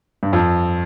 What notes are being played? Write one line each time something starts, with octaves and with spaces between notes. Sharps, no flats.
G2
F2